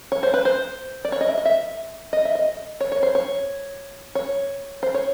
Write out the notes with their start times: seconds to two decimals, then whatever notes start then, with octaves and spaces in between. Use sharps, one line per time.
0.12 C#5
0.23 C5
0.34 B4
0.45 C5
1.05 D5
1.12 C#5
1.21 D#5
1.29 E5
1.38 D#5
1.45 E5
2.13 D#5
2.25 E5
2.35 D#5
2.80 C#5
2.92 C#5
3.03 C5
3.15 C#5
4.15 C#5
4.83 C5
4.94 C#5